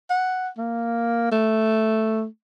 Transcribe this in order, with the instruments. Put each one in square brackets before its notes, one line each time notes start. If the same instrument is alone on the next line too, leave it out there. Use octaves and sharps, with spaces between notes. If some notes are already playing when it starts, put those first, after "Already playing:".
[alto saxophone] F#5
A#3
A3